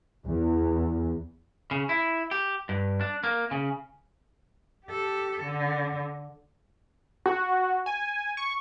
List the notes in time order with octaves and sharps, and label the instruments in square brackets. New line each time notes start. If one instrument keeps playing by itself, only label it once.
[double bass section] E2
[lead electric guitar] C#3
E4
G4
G2
D4
A#3
C#3
[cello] G4 A4
D3
[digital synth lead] F#4
G#5
C#6